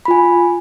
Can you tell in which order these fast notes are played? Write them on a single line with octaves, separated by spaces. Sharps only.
B5 F4 G#5